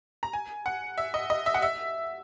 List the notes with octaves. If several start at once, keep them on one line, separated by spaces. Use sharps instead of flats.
A#5
G#5
F#5
E5
D#5
D#5
E5
F#5
E5